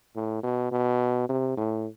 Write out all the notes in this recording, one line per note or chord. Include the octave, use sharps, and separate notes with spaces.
A2
B2
B2
C3
A2